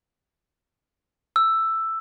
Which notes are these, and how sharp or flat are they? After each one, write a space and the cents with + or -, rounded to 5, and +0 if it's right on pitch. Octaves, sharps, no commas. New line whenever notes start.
E6 +5